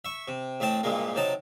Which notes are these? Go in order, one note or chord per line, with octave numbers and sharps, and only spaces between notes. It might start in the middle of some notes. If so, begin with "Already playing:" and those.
E5 C#6
C3
A1 A3 C4 A5
C2 G2 A#2 G#3 A#3
C3 F#3 D#4 A5